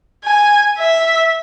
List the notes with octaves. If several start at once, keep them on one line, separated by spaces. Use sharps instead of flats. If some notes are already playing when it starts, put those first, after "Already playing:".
G#5
E5